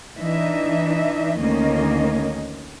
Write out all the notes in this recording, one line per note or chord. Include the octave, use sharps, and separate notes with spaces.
E3 D4 D#4 D#5 E5
D2 D#3 A#3 C#4 D#5